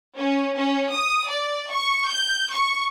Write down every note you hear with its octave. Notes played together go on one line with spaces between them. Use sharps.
C#4
C#4
D#6
D5
C#6
G6
C#6